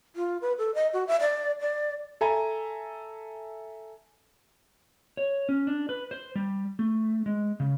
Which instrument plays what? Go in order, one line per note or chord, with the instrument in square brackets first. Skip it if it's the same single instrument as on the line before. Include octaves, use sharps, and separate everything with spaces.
[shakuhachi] F4
B4
A4
D#5
F#4
E5
D5
D5
[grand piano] A4 E5 G#5 A#5
[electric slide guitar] C#5
C#4
D4
B4
C5
G3
A3
G#3
C#3